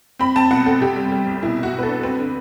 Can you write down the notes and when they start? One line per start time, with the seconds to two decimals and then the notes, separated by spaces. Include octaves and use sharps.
0.19 C4 B5
0.36 C4 A5
0.50 B2 F#5
0.66 C4 A4
0.81 C3 G4
0.96 G3
1.12 G3
1.27 C2
1.43 B2 E4
1.58 B2 F#4
1.73 B2
1.79 B4
1.83 A4
1.88 D4
2.03 C4 B4
2.19 D3